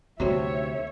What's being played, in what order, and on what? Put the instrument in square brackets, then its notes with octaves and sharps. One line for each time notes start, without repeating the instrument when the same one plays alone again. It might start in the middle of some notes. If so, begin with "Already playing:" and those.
[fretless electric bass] D2 C3 [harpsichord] F#3 G3 C4 [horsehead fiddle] C#5 E5